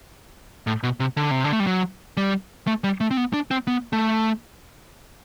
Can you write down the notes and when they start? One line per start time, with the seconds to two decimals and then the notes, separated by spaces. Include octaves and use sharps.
0.67 A2
0.83 B2
1.00 C3
1.17 D3
1.31 C3
1.44 D3
1.53 A3
1.60 G3
1.67 F#3
2.17 G3
2.67 A3
2.84 G3
3.01 A3
3.11 C4
3.17 B3
3.33 D4
3.51 C4
3.67 B3
3.93 A3